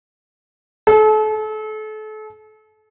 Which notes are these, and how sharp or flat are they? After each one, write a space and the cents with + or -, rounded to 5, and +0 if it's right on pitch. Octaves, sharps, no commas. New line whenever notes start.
A4 -35